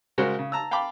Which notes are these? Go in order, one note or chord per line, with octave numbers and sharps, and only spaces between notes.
C#3 G#3 F#4 A#4 C5
C#3
A5 A#5 E6
F5 G5 A5 B5 D6